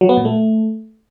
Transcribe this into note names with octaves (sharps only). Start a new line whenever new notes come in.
F#3
B3
A#2
A3